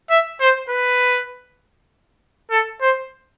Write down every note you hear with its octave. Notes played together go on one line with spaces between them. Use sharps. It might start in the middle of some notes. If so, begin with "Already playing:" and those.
E5
C5
B4
A4
C5